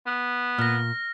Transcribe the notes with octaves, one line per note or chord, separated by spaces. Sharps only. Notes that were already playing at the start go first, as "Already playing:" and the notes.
B3
A#2 F6 A#6